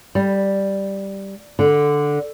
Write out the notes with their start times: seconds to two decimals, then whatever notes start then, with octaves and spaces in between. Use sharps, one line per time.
0.15 G3
1.59 D3